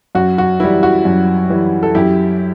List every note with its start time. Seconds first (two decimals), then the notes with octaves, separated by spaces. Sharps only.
0.15 F#2 F#4
0.38 F#4
0.60 E3 G3 E4
0.83 F#4
1.05 F#2
1.49 E3 G3
1.83 A4
1.95 F#2 E4 G4